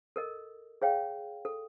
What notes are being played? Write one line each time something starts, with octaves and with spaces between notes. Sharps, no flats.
A4 A#4 D#5
G#4 C#5 F5 G5
A4